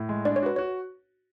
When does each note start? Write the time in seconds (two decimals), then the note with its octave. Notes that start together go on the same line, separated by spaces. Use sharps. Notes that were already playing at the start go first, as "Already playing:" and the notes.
Already playing: A2
0.09 G#3
0.25 D4 D5
0.36 C#5
0.43 F#4 B4
0.56 F#4 C#5